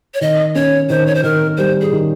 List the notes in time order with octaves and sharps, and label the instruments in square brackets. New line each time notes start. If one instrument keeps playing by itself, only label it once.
[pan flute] C#5
[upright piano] D#3 [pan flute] D#5
[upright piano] C#4 [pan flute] C#5
[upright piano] D#3 [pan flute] C5
[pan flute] C#5
C5
[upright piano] D#3 [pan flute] A#4
[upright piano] G3 [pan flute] C5
[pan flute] G#4
[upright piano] D#3